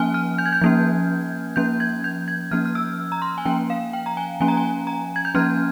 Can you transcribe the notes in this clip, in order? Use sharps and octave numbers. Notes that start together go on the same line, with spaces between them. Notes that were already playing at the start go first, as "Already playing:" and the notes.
Already playing: F3 A#3 C#4 G#5 F6
F6
G6
G#6
G6
F3 A#3 C#4
F3 A#3 C#4 G6
G#6
G6
G#6
F3 A#3 C#4 F6
F6
E6
A#5
C6
G#5
F3 A#3 C#4 G5
F5
G5
A#5
G#5
F3 A#3 C#4 G#5
A#5
G#5
A#5
G#6
G6
F3 A#3 C#4 F6